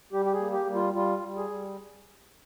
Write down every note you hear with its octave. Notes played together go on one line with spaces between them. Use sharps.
G3 G4
G4
G#4
A#3
G4
G3
F4
G3 F4
G3
G#4
G3